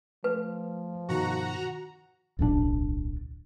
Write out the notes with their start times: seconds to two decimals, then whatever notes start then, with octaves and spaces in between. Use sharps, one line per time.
0.24 F3 A3 B4
1.09 G2 B2 D#3 F#4 F#5 A#5
2.39 D1 B1 C#3 D4